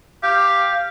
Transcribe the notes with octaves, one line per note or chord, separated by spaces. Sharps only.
G4 F5